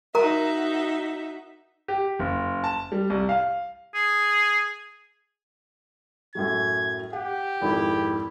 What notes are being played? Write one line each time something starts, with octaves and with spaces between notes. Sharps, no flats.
D#4 F#4 A#4 E5 A#5
G4
F#1
A5
G3
C2
F5
G#4
F#2 A2 F#3 G#6
G4 F#5
G#1 F2 G#2 E4